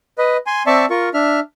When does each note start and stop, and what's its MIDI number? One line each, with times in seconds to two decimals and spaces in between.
0.18 0.37 71
0.18 0.37 75
0.47 0.63 80
0.47 0.63 84
0.66 0.86 60
0.66 0.86 74
0.66 0.86 76
0.66 0.86 81
0.66 0.86 85
0.90 1.09 65
0.90 1.09 70
0.90 1.09 85
1.14 1.40 62
1.14 1.40 76
1.14 1.40 89